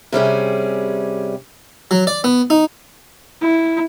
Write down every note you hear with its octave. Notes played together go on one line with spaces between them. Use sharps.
C3 G3 C#4 G#4
F#3
D5
B3
D#4
E4